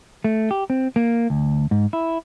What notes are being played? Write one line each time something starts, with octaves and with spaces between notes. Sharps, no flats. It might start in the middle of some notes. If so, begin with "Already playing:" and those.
A3
G4
C4
A#3
D2
G#2
E4